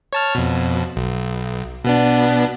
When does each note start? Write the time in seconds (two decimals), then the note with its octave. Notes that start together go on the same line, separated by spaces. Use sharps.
0.13 C#5 A5 F6
0.35 F2 B2
0.96 B1
1.84 B2 B3 D4